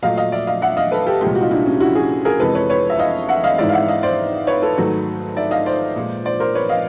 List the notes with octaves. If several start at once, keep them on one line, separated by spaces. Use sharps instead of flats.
A#2 F#3 A3 D#5 F5
D#5 F5
D5 E5
D#5 F5
E5 F#5
D#5 F5
A4 B4
G4 A4
C2 A#2 F3 G#3 F4 G4
F#4
D#4 F4
D4 E4
C#4
E4 F#4
F#4 G#4
G#4 A#4
F2 C3 E3 G#3 A4 B4
B4 C#5
B4 C#5
E5
D#5 F5
E5 F#5
D#5 F5
G#2 E3 G#3 D5 E5
F5
E5 F#5
D#5 F5
C5 D5
B4 C#5
A4 B4
G#2 D#3 F#3 A3
D5 E5
D#5 F5
C5 D5
A#2 F3 G#3
C5 D5
A#4 C5
B4 C#5
D#5 F5